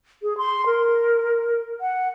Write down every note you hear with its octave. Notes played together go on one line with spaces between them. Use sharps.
G#4
C6
A#4
F#5